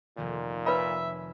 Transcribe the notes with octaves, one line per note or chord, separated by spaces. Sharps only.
F1 F2 A#2 D#3
B4 C#5 E5 G#5 B5